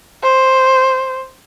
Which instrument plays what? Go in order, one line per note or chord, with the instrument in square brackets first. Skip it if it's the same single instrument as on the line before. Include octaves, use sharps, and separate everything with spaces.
[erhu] C5